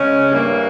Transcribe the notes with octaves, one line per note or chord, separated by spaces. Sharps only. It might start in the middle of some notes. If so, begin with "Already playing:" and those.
Already playing: C#3 G#3 C#4
G2 E3 A#3